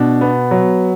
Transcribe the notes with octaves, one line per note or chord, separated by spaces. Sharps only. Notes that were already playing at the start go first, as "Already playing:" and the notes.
Already playing: B2 D4
B3
F#3